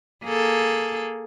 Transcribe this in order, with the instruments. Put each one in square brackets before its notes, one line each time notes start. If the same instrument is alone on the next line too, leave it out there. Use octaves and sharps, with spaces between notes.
[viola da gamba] A#3 G#4 A4